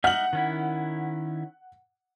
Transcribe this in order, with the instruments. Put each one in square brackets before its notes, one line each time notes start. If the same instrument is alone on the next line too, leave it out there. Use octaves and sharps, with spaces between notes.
[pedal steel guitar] D#4 E5 F6 [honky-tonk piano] F#5 F#7
[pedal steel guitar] D#3 C#4 E4